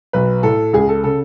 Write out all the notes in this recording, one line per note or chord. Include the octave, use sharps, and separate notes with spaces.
B1 B4
A2 A4
C#2 G#4
A4
C#3 A4